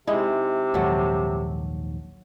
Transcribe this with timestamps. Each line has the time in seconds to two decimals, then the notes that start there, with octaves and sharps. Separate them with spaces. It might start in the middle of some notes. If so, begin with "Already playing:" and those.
0.07 C3 G#3 D#4 E4
0.74 A#1 D#2 G#2 F#3 A4